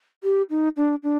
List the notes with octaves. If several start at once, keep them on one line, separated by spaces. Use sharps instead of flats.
G4
D#4
D4
D4